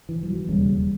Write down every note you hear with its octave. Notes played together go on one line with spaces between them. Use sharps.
E3
F3
F#3
E1 D#2 C#3 G3